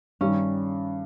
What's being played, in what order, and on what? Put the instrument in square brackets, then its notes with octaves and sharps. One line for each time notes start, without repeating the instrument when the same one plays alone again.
[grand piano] G2 D#3 G3 [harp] C#4